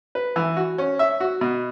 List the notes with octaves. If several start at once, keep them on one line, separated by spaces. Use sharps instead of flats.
B4
E3
F#4
C#4
E5
F#4
B2